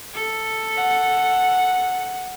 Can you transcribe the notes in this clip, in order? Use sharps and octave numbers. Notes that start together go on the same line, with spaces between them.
A4
F#5